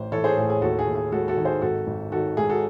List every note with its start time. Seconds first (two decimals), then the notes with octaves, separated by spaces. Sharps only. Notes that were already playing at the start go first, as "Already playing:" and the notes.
Already playing: A1 A3 C5
0.12 E3 A4 C#5
0.24 G#4 C5
0.37 A2 G#4
0.50 G#4
0.62 D#2 F#4 A4
0.79 G#4
0.87 D#2
0.95 G#4
1.12 G#3 F#4 A4
1.28 F#4 A4
1.37 D#3
1.45 G#4 C5
1.62 G#1 F#4 A4
1.87 G#1
2.11 D#3 F#4 A4
2.37 G#2 G#4
2.50 F#4 A4